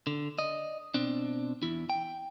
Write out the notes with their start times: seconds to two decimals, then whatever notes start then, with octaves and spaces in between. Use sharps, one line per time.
0.07 D3
0.39 D5 D#5
0.94 B2 C4 D4
1.63 E2 E4
1.90 G5